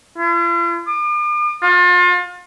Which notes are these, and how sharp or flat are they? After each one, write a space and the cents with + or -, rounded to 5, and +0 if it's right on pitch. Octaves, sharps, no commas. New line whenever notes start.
F4 -45
D6 +40
F4 +35